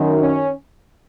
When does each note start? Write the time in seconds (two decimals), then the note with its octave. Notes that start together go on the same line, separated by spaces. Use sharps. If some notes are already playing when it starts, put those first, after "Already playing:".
Already playing: F#2 D#3
0.18 C#4